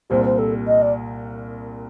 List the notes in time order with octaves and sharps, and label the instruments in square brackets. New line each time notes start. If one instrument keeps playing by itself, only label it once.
[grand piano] C2 A#2 G3 [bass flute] C5
[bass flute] C5
A4
D#5
D5